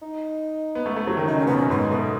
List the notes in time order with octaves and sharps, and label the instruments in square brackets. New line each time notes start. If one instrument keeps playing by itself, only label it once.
[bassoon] D#4
[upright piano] B3
A3
A3
F#3
D#3
[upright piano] C#3 [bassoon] D#4
[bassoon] C#4
[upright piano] B2 [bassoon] B3
[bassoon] C#4
[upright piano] G#2 [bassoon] B3
[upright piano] B2 [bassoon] A3